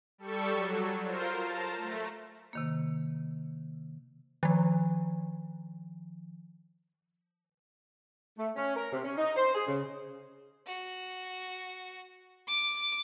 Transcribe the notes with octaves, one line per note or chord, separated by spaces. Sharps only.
G3 A4 C#6
F#3
F4 A#4 C5
A5 A#5
A3
C3 D#3 A#3
D#3 F3
A3
C#4
A#4
C3
C#4
D#4
C5
G#4
C#3
F#4
D6